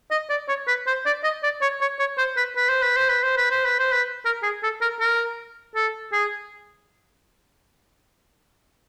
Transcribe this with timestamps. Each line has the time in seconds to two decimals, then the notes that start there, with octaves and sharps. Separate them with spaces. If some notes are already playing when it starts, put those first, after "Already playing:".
0.11 D#5
0.30 D5
0.48 C#5
0.67 B4
0.87 C5
1.06 D5
1.24 D#5
1.43 D5
1.62 C#5
1.81 C#5
1.99 C#5
2.18 C5
2.37 B4
2.56 B4
2.69 C5
2.82 B4
2.97 C5
3.10 B4
3.23 C5
3.37 B4
3.51 C5
3.65 B4
3.79 C5
3.92 B4
4.25 A#4
4.43 G#4
4.63 A4
4.81 A#4
5.00 A#4
5.75 A4
6.13 G#4